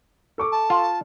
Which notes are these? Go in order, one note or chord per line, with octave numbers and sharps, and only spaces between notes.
A4 C#6 D6
A5
F4